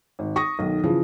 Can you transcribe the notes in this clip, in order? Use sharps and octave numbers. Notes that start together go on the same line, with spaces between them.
G#1
C#6 D#6 A#6
B1 D#3
C#3 E3 F3